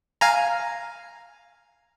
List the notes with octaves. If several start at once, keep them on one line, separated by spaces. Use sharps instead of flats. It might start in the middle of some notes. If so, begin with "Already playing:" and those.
F5 G#5 A#5